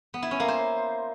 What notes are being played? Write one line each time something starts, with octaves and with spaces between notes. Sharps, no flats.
B3
E4
C#4
A#3
C5